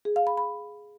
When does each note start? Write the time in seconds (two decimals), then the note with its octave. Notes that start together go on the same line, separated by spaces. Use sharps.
0.05 G#4
0.16 F5
0.27 B5
0.37 B5